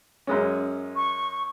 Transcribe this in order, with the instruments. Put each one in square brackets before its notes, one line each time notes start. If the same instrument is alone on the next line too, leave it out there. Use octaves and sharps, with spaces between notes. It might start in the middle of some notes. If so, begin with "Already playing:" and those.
[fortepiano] F#2 G#3 C#4
[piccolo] C#6